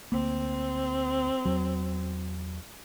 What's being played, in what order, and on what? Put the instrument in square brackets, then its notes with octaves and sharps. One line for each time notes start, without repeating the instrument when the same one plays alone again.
[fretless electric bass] D2 A#3 [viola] C4
[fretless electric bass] E2 F#3